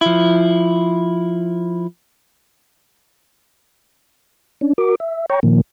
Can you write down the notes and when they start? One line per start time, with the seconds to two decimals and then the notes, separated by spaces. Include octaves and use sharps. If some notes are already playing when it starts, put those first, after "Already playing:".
0.01 F3 E4
4.61 C#4 D4
4.78 F#4 A#4 D6
5.00 E5
5.30 C#5 G5 A#5 C#6
5.43 A#2 D#3 F3 A#3